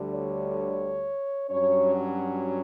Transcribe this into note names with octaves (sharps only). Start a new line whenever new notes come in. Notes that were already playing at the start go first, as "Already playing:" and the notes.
Already playing: D2 D3 G3
C#5
G2 F#3 C#4 C#5
F#4